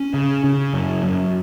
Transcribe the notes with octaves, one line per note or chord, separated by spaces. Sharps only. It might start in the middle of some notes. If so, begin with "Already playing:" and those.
Already playing: C#4
C#3
C#3
F#2
F#2